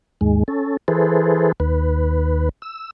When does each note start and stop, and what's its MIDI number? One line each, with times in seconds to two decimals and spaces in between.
0.21 0.43 39
0.21 0.43 44
0.21 0.43 56
0.48 0.77 61
0.48 0.77 69
0.88 1.52 52
0.88 1.52 68
0.88 1.52 69
0.88 1.52 71
0.88 1.52 72
1.60 2.49 39
1.60 2.49 71
2.62 2.91 88